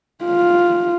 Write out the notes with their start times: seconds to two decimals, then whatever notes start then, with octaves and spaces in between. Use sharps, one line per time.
0.25 F4